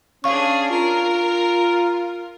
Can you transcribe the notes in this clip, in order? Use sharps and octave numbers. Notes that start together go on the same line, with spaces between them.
C#4 D4 G#4 F5 C#6
F4 A#4